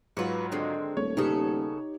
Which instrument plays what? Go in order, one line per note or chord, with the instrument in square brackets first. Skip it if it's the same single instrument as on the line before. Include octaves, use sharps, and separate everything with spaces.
[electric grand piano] G#2 F#3 F4 [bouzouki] F#4 B4
[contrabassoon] D3 [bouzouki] D#3 G#3 C4
[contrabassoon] D#1 [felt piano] A3 [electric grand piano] C#5
[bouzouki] C#3 B3 A4 [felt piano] D#4 G4